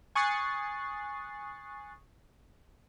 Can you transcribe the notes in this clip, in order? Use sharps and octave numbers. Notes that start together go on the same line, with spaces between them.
G#5 C#6 D#6 F#6 A6 C7